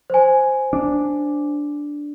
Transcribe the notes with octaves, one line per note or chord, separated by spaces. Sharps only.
C5 G#5
D4